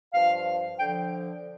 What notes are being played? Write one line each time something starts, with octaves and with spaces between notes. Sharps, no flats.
G2 F3 F5
D3 F3 G5